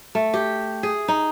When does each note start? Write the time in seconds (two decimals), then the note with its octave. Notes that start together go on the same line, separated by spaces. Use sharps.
0.15 A3
0.34 G4
0.83 G#4
1.08 D#4